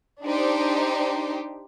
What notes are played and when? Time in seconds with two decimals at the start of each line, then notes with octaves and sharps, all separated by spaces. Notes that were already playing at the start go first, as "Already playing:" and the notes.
0.24 D4 D#4 G4 C5